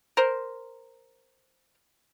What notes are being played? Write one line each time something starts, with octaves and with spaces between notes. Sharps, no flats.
A#4 C5